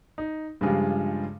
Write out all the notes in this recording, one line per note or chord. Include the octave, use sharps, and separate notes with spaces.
D#4
G2 C#3 F3 G3 G#3 F4